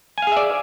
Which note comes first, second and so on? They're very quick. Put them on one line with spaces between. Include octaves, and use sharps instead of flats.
G#5 F5 G#4 E5 D5